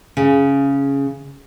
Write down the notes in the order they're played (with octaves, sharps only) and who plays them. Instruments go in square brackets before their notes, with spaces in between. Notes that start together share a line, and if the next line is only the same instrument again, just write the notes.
[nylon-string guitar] C#3